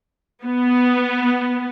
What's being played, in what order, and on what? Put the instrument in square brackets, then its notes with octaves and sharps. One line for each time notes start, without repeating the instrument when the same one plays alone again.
[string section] B3